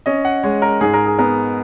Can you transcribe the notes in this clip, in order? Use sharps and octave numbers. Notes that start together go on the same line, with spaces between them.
C#4 D#5
F#5
G#3 C#5
A#4
G#2 G#4
A#4
G#4
B3 A#4